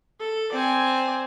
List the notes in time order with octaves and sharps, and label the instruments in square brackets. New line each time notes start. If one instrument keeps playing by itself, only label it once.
[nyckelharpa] A4
[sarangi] C4 [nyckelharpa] D5 G#5